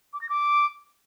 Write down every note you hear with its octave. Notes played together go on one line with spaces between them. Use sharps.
D6
A#6
D6